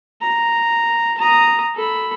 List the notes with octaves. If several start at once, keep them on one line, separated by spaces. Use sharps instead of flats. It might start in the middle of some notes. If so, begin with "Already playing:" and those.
A#5
A#5 D#6
A4 B5